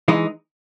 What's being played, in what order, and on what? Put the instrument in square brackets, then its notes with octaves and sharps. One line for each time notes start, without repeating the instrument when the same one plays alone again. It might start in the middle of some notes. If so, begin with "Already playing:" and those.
[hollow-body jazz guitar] E3 G#3 D#4